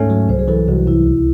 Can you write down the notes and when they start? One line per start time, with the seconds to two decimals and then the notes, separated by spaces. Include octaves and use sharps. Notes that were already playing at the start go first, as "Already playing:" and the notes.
Already playing: G#2 A3 C#4 A4
0.10 F#3
0.28 C2 C5
0.39 G#4
0.48 E3 A4
0.68 C2 F#4
0.87 C3 E4
1.06 C#2